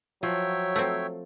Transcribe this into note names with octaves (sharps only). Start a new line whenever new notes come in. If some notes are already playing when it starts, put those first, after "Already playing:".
F3 F#3 C#5 E5 G5
A3 C4